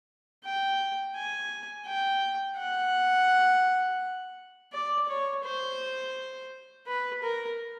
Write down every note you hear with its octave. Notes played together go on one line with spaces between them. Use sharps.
G5
G#5
G5
F#5
D5
C#5
C5
B4
A#4